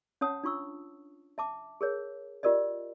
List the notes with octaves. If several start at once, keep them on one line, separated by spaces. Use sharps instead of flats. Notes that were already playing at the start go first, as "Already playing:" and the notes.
C#4 C#5 F#5 A5 D#6
D4 F4 C#6 E6
E5 A5 D6
G#4 A#4 C#5
F4 G4 A#4 D5 D#5